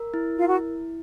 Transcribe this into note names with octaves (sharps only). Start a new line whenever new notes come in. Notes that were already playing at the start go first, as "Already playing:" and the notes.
Already playing: A#4
E4
F4
F#4